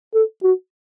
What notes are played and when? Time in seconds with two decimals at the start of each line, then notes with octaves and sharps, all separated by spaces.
0.14 A4
0.43 F#4